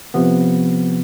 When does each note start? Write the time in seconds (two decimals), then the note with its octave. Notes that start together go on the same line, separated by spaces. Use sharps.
0.14 C3 F3 B3